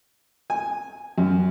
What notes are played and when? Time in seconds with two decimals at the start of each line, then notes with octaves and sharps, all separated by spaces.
0.50 G#5
1.18 F#2